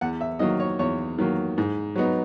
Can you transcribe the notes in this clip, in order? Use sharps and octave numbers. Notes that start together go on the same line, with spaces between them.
E2 F#5
E5
D#3 F#3 A#3 D#5
C#5
E2 C#5
D#3 F#3 A#3
G#2
F#3 B3 D#4